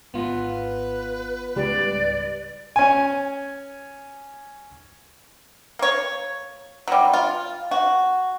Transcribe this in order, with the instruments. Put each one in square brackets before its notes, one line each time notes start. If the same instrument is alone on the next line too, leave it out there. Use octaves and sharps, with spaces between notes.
[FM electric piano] G#1 [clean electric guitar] B3 F4 [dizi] B4
[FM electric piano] C#2 G#2 G3 [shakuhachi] D5
[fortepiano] C#4 G#5
[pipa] A#3 C#5
F#3 G3
F4
F#4